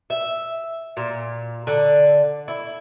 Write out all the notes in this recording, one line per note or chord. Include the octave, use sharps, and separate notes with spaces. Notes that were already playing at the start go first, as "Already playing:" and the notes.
E5
A#2
D3
E4